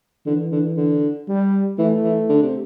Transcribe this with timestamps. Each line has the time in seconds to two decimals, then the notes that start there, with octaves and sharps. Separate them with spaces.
0.26 D3 E3
0.52 D3
0.77 D3
1.28 G3
1.78 E3 A3
2.04 E3
2.29 D3
2.43 C3